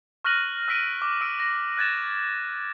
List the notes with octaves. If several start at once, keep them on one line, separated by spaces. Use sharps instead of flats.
C#6 F6 F#6 A#6 D#7 F#7
E6 F6 B6 D7 D#7
D6
E6 D7
A#6
F#6 G#6 A6 E7